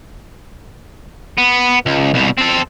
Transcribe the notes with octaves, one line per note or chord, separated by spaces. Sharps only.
B3
C#2
C2 B2
C4 A4